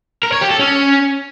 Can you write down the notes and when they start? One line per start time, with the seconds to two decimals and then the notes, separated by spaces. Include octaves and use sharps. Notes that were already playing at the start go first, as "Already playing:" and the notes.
0.23 A#4
0.32 C#5
0.41 G4
0.50 A4
0.59 C#4